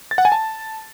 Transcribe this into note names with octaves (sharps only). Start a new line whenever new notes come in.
A6
F#5
G#5
A5